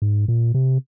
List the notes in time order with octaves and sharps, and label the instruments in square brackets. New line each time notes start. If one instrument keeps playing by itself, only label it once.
[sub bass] G#2
A#2
C3